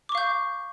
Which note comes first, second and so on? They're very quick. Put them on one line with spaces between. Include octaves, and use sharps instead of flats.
D6 C#6 F5 G6